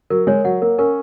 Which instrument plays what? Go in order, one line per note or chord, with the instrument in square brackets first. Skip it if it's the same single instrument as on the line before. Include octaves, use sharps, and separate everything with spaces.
[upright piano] F#3 [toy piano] A#4
[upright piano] G#3 [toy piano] C#5
[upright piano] F#3 [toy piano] F#5
[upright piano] A#3 [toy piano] A#4
[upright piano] C#4 [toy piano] A#4